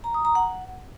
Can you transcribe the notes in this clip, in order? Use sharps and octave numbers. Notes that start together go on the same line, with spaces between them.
A#5
D#6
A#5
F#5